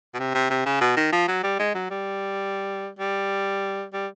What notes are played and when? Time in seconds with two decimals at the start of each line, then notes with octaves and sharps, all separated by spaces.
0.14 B2
0.19 C3
0.34 C3
0.50 C3
0.66 C#3
0.81 B2
0.97 D#3
1.12 F3
1.28 F#3
1.43 G3
1.59 G#3
1.74 F#3
1.90 G3
2.99 G3
3.93 G3